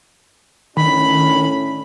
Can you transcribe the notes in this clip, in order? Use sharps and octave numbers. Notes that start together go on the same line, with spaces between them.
A2 D#3 C#4 D4 B5